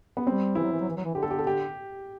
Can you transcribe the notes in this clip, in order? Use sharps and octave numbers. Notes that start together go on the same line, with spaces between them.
B3
G3 C4
E3 E4
F#3
E3
F#3
E3
F#3
E3
D3 G4
A4
G4
A4
G4